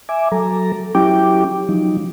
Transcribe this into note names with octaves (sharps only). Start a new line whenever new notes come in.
E5 G#5 D6
F#3 A4 A#5
F#3 C#4 E4 G4 G5 D6
F3 F#3 D#4